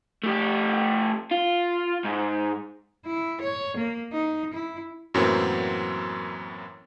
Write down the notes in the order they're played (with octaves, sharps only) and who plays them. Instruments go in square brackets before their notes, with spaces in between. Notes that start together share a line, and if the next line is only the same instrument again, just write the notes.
[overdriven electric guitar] A3 G4
F4
G#2
[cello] E4
C#5
A#3
D#4
E4
[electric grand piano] F#2 A2 E3 F#3 A#3 C4